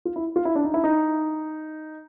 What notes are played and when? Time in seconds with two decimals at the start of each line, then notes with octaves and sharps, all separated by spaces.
0.05 F4
0.16 E4
0.36 F4
0.45 E4
0.55 D4
0.65 D#4
0.74 E4
0.84 D#4